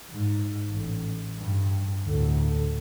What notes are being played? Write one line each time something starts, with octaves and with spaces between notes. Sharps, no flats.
G#2
A1
G2
D2 A2